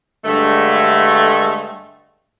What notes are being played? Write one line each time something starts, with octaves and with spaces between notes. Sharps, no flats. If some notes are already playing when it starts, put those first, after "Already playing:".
G2 D3 G#3 A3